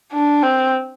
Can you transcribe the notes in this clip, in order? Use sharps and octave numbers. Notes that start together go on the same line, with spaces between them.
D4
C4